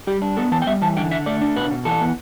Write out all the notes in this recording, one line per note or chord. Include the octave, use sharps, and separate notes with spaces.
G3 G4
D4
B3 A4
E3 A5
G5
G3 E5
E3 A5
D3 G5
D3 E5
A3 D5
D4
B2 B4
B2
E3 A4
B3